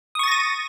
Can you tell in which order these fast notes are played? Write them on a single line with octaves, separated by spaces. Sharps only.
D#6 C#6 A6 A#6 D#7